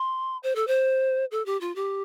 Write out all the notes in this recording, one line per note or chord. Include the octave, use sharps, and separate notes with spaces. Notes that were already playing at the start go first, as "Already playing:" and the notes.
Already playing: C6
C5
A4
C5
A4
G4
F4
G4